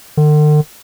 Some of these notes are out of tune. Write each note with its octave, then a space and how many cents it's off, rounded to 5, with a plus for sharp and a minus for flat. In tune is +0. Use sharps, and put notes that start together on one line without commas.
D3 +45